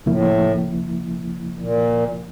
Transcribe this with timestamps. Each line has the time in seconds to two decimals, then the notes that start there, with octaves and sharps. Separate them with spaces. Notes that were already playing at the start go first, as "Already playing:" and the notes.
0.06 C#2 A2 C#3 F3 A#3 E4
1.59 A#2